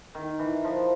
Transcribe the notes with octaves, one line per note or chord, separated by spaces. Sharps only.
D#3
E3
F3